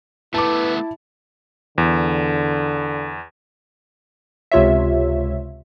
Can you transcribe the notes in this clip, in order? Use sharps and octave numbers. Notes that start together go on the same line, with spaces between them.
A3 B3 E4 B4 A5 D6
E2 D3
C#2 C3 F4 C#5 E5